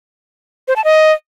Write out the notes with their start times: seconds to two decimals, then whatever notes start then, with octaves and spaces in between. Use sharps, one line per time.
0.68 C5
0.76 A5
0.84 D#5